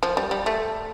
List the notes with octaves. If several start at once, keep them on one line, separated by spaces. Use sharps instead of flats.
F3
G3
G3
A3